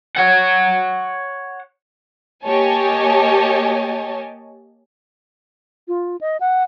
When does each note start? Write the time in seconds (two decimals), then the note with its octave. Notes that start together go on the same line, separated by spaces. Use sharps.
0.17 C#5 F#5
2.45 A#3 G4 C#5 D#5 G#5 A5
5.88 F4
6.21 D#5
6.40 F#5